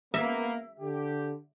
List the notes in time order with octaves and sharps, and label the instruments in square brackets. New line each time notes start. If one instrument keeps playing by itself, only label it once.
[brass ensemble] A#3 [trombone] B3 [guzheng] E5
[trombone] D3 [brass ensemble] G4